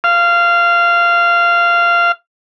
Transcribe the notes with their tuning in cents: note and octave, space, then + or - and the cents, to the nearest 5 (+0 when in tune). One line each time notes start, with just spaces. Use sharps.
F5 -15